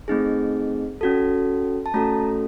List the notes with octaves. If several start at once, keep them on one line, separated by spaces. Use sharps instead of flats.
A3 C4 D#4 G#4
C#4 F#4 A4
A5
A3 C#4 F#4 A4 A#5